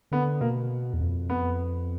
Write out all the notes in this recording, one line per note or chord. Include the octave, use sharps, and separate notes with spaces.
D3 B3
B2 A#3
E2
F2
B3